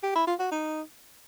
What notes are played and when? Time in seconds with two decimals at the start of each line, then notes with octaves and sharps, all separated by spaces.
0.03 G4
0.15 E4
0.27 F4
0.39 F#4
0.51 D#4